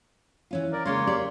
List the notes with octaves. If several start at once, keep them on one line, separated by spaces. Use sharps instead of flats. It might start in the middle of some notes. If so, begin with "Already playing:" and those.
E3 C#4 F4
A#4 D5
C#3 G#3 A#3 C#4 C#5 C6
G4 D5